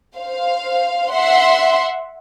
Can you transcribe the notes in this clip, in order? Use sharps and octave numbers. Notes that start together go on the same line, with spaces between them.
C5 F5
E5 F#5 C6